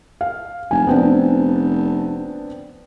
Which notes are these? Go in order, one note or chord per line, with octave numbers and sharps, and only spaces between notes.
F5
F1 G#5
F1 B3 C4 D4